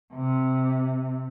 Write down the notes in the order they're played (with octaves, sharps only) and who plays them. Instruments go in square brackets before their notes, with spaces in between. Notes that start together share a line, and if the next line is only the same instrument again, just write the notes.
[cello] C3